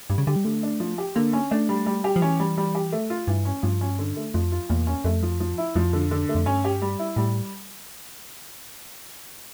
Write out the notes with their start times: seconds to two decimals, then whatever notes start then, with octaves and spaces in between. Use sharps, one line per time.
0.09 G2 G3
0.18 C#3
0.27 D3 G4
0.36 G3
0.45 D3 A3
0.63 D4
0.80 F3
0.98 G4
1.15 D3 A#3
1.33 C#4
1.51 A3 D4
1.69 G3
1.86 G3
2.04 G4
2.16 F3
2.22 E3 C#4
2.40 G3
2.57 G3
2.75 G4
2.92 A3
3.10 F4
3.28 G2 E3
3.45 C#4
3.63 G2 F3
3.81 C#4
3.99 D3
4.17 A3
4.34 F2 F3
4.52 F4
4.69 E2 A#2
4.87 C#4
5.04 F2 A3
5.23 F3
5.40 F3
5.58 E4
5.75 F2 F3
5.93 D3
6.11 D3
6.29 A3
6.35 F2
6.46 G2 C#4
6.64 G4
6.82 G3
6.99 E4
7.16 A2 G3